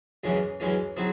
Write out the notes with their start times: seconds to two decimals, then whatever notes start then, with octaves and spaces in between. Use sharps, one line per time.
0.24 F#2 E3 G#3 C#4
0.60 F#2 E3 G#3 C#4
0.97 F#3 C4 E4 G#4